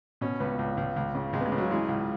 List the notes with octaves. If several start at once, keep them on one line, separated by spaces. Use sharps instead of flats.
B2 C#4
C#2 B3
C#2
C#2
C#2
C#3
C#2 G#3
B3
G#3
C#3
F#3
E3 G#3
C#2